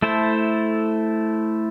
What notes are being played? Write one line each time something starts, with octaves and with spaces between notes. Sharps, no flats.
A3 E4 A4 C5